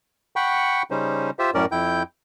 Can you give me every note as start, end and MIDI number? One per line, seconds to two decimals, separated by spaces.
0.36 0.83 78
0.36 0.83 79
0.36 0.83 83
0.36 0.83 85
0.91 1.30 49
0.91 1.30 55
0.91 1.30 61
0.91 1.30 63
0.91 1.30 72
1.39 1.51 65
1.39 1.51 67
1.39 1.51 72
1.39 1.51 76
1.54 1.65 42
1.54 1.65 45
1.54 1.65 61
1.54 1.65 70
1.54 1.65 74
1.72 2.03 41
1.72 2.03 64
1.72 2.03 79
1.72 2.03 91